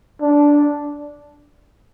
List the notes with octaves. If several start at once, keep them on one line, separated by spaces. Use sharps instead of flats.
D4